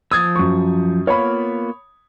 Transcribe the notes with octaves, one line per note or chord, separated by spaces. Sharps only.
F3 C5 D#6 E6 G#6 A6
F#2 C#6
A#3 B3 F4 C#5 B5